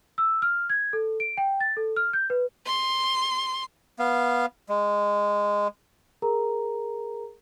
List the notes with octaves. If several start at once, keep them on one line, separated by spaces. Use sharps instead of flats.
E6
F6
G#6
A4
D7
G5
A6
A4
F6
G6
B4
C6
B3 F5
G#3
G#4 A#4 A#5